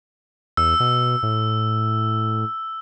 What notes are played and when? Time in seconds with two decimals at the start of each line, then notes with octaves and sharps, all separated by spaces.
0.57 E2 E6
0.80 B2
1.23 A2